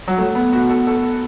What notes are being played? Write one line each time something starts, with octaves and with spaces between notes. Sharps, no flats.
F#3
A3
B3
F#4
A4
A4